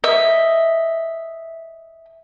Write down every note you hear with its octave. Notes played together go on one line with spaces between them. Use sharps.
D#5 E5